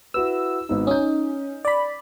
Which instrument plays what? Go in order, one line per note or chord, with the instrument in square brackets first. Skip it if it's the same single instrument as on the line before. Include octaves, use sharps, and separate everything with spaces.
[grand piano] E4 F#4 B4 [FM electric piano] E6
[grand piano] G#1 B3 D#4
[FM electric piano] C#4 D#4 [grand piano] D#6 G6
[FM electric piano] D5 B5